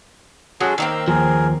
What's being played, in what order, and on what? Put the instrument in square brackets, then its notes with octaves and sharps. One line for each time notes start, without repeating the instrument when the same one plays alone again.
[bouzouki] F#3 G#3 F#4 [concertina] C#4 A4
[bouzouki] D#3 A#3 C4 [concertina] D#4 E6
[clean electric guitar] D#2 F3 [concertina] G#4 A#4